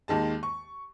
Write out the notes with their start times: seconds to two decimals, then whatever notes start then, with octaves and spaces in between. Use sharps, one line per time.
0.08 D#2 D#3 G#3 A5
0.43 C#6